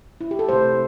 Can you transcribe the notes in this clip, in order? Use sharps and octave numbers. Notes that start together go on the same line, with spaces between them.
E4
G4
A4
C3 A3 C5